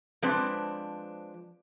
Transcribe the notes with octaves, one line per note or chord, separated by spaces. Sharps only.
F3 G#3 C4 D4 B4 D5